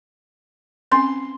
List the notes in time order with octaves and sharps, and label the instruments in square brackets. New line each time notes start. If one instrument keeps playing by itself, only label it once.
[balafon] C4 C#4 G#5 [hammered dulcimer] C6